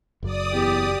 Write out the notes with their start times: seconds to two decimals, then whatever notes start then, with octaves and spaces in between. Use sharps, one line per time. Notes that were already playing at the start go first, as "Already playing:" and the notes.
0.23 F#1 F#2 F#3 D5 D#6
0.54 E2 G4